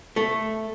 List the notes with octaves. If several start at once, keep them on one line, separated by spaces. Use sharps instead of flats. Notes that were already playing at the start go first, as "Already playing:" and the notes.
A3